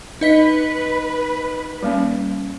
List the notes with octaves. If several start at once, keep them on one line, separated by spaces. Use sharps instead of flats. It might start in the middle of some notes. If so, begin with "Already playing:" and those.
D#4 B4 D#5 B6
G3 A#3 C#4